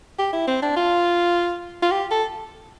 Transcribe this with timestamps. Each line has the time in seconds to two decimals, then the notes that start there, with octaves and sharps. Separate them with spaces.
0.19 G4
0.33 E4
0.48 C4
0.62 D4
0.76 F4
1.82 F4
1.91 G4
2.11 A4